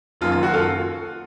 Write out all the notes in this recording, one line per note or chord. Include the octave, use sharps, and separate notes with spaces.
F#1 F#2 D#3 A#3 F4
F4
F#4
F4 A4